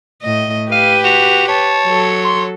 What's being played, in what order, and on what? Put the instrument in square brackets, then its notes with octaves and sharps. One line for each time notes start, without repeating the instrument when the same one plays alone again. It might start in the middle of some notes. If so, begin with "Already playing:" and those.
[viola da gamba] A2 D#5
[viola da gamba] G4 B4 [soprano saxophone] F5 [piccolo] D#7
[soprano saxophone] F#4 [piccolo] F7
[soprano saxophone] C#5 [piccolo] A5
[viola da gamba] F#3 A4
[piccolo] C6